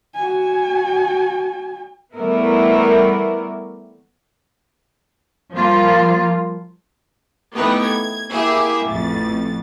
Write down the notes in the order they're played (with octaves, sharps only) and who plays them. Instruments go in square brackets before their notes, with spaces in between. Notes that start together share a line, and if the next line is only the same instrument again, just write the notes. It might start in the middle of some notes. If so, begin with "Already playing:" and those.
[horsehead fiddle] F#4 G#5
[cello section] E3 G3 A3 B3 E4 A#4
F3 G3 A#3 F4
[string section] E3 A3 B3 D#4 G4 B4
G#6
A#3 E4 G4 G#4 E5
A1 F2 A6